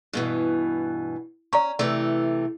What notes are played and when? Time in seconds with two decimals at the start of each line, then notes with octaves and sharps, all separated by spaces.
0.13 G2 B2 E3
1.53 C#4 D5 A#5 C#6
1.79 C3 E3 A3 D5